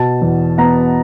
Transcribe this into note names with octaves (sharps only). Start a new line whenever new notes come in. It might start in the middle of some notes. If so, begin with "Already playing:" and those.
Already playing: B2 A5
E2
B3 A#5